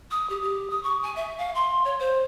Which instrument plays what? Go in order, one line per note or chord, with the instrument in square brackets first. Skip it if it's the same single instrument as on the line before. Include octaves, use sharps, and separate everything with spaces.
[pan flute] D#6
G4
G4
D#6
C#6
G#5
E5
F5
C6
C#5
C5